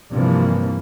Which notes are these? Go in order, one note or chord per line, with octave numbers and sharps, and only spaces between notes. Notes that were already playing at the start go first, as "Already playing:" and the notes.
G2 C3 E3 F3 A#3